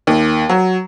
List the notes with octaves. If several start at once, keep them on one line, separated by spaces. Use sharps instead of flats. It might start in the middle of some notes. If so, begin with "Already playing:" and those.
D#2
F#3